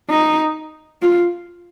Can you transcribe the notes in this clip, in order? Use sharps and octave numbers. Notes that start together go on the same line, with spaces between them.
D#4
F4